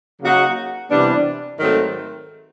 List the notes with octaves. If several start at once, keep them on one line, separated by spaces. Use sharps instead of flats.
C#3 F#3 A#3 D#4 F#4
C3 E3 G3 B3 D4
G#2 D#3 F#3 A3 C4